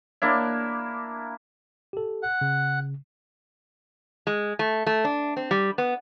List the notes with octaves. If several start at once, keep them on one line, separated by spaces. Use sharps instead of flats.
A#3 D4 E4
G4 A4
F#5
C#3
G#3
A3
A3
D4
C4
G3
B3